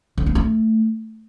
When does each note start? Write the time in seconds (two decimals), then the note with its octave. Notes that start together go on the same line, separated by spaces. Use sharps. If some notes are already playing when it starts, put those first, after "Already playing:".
0.18 D3
0.26 A#3
0.35 A3